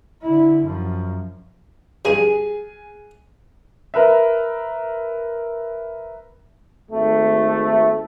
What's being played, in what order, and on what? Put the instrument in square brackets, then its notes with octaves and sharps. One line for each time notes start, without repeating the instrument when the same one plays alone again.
[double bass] D3 E4
F#2 F3
[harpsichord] G2 F3 D4 [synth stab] G#4 [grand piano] G#5 D#7
[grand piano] A#4 B4 E5
[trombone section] G#1 A3